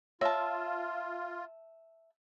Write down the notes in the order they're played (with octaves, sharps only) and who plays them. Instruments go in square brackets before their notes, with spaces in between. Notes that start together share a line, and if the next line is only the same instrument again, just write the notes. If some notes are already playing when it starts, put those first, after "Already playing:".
[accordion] F4 [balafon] C#5 [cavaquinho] E5 A5